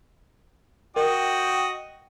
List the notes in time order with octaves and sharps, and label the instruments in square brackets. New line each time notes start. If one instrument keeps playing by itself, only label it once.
[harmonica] F#4 D#5 D#6 [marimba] A#4 [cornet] G5